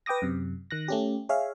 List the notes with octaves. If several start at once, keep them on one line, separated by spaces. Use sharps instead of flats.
B4 G5 D6 D#6 A#6
F#2 C3
D#3 F#6 A#6
A3 C#4 G4
G#4 C#5 E5 F5